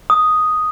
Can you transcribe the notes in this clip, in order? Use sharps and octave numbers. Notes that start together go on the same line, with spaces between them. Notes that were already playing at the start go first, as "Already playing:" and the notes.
D#6